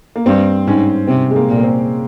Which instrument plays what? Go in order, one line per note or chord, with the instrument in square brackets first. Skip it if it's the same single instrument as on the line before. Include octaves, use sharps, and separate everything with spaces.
[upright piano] A#3
[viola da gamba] G2 [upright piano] C4
[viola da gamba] G#2 [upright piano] C#4
[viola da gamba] C3 [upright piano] C4
[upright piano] G#3
A#3
[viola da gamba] A#2
[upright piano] A#3
C4